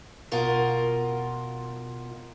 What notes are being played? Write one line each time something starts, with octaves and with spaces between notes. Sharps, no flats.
B2 F4 A#4